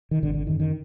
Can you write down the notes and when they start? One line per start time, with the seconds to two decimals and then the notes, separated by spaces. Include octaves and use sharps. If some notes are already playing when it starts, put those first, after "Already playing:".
0.11 D#3
0.22 G#1 D3
0.34 D3
0.47 F#2 D3 D#3
0.60 D#3